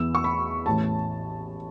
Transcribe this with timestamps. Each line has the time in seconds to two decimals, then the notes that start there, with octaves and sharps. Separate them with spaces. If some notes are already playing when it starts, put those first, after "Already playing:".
Already playing: E2 E3 B3 E6
0.15 C#6
0.24 B5
0.66 A1 A2 E3 A5